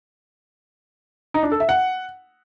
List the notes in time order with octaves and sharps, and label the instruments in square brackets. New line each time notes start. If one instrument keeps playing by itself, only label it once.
[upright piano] D#4
D4
A4
E5
F#5